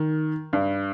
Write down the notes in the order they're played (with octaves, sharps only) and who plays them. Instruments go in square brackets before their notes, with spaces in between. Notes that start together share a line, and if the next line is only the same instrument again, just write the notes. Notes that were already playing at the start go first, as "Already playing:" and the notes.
Already playing: [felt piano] D#3
G2